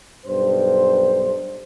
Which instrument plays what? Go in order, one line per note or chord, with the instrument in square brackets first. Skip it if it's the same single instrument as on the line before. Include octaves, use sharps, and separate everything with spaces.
[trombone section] B1 G2 C5